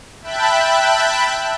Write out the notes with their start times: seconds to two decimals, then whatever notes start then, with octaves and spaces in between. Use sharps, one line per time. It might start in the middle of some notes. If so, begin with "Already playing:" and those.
0.22 E5 G5 A5 B5 F#6